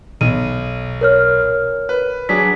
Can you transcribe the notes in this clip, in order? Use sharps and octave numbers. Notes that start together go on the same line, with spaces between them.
B1 D#7
A#4 C#5 F6
B4
F#3 D4 G#4 B6